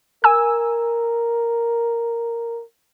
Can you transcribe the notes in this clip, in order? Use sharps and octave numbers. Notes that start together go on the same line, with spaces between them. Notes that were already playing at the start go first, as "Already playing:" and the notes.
A#4 G#5 E6